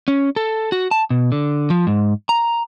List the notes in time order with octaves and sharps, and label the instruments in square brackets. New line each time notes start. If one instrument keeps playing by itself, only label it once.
[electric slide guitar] C#4
A4
F#4
A5
B2
D3
F3
G#2
A#5